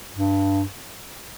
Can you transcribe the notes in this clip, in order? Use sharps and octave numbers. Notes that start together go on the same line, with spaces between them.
G2